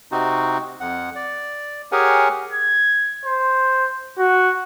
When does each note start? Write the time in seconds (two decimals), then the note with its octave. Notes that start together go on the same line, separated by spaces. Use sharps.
0.12 C3 C4 D#4 F#4
0.80 F2 F#5
1.15 D5
1.92 G4 G#4 A#4 C#5 F#5 G#5
2.52 G#6
3.25 C5
4.19 F#4